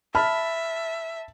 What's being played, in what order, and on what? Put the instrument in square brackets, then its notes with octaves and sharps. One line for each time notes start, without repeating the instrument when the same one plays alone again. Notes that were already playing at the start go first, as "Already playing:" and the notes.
[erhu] E5 [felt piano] A5 B5 F6